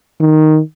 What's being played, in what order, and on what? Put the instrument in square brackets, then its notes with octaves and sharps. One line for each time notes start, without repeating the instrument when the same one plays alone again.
[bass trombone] D#3